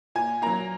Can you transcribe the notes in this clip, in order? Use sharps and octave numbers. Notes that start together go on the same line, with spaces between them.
A#2 G#5
F#3 A#3 A#5